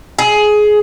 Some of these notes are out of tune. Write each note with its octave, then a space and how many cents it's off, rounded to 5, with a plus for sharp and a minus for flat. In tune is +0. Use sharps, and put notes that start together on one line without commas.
G#4 +15